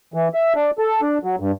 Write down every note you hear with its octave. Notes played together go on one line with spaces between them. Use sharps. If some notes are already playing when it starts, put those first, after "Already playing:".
E3
E5
D4
A4
D4
F#3
G2